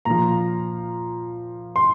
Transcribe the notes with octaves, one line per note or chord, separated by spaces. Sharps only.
A#2 F3 A#5
C6